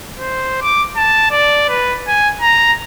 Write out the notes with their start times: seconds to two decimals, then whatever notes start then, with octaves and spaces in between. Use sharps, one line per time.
0.19 C5
0.62 D6
0.96 A5
1.31 D5
1.69 B4
2.08 G#5
2.41 A#5